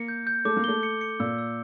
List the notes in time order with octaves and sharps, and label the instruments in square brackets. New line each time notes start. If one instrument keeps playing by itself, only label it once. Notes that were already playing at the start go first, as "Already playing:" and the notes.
Already playing: [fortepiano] A#3 [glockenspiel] C#7
[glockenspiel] G6
G6
[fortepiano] A3 [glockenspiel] D6
[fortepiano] A#3
[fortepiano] A3 [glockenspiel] G7
[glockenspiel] C#7
C#7
[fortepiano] A#2 [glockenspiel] E6
[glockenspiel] E6